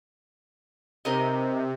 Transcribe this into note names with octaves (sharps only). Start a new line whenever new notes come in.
C3 D#4 A#4 D#5